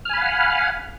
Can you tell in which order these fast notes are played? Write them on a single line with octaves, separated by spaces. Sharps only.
F6 G#5 B5 F5 F#5